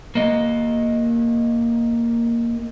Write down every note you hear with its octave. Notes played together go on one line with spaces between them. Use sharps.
A#3 D#5